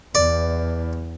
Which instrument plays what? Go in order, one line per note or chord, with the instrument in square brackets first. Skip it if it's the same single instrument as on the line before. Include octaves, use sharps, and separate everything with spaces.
[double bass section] E2 [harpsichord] D5